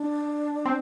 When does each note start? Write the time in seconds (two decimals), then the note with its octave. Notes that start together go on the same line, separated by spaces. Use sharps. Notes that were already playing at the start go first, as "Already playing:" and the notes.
Already playing: D4
0.65 C4